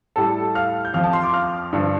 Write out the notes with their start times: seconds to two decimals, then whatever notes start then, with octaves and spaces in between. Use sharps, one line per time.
0.16 A2 G3 A4 A5
0.55 F5 F6
0.85 G6
0.93 F2 F3 F5 F6
1.03 A5
1.13 C6
1.23 D6
1.33 F5 F6
1.73 G2 D3 F3